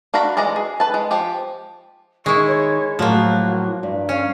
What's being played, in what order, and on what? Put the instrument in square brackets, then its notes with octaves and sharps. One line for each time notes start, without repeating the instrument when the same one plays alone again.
[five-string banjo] D4 F#4 F5 A#5 B5
E3 G#3 D5 A#5
G#4
B4 A5
G#3
F3 G4
[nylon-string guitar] D#3 [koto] G#3 E4 [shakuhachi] C#6
[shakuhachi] C#5
[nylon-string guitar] A2 F#3 [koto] F3 A#3 [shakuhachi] F#4
[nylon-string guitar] G2
[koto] C#4 [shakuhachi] F5